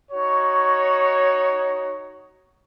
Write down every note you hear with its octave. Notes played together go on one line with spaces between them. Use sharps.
D#4 F#4 C#5